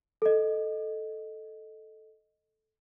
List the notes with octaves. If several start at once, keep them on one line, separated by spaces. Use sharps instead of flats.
A4 D#5